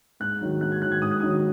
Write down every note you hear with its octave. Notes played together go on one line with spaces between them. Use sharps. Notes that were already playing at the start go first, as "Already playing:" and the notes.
G#2 F#6
D#3 F#3
G#2 F#6
G#6
D#3 F#3 F#6
G#6
G#2 D#6
F#6
D#3 F#3 D#6